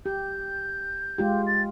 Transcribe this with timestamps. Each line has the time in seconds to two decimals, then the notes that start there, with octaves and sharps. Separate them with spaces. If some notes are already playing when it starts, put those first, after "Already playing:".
0.06 G4 G6
1.18 G#3 F4 G4
1.47 A6